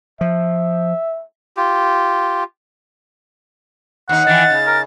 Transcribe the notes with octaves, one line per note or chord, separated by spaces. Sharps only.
F3 E5
F4 G4
D#2 D#4 F#5
D#3 E3 A6
C#3
A#4